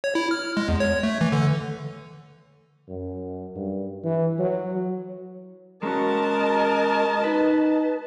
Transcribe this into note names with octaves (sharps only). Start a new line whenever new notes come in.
C#5
E4
F6
G#3
E2
C#5
A3
E3
D3
F#2
G2
E3
F#3
G#3 C#4 F#4 A#4 D#5 A5
D#4 B4